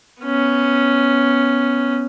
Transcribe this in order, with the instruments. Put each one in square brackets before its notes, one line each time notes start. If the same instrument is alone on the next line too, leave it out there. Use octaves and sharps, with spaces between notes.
[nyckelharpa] B3 C#4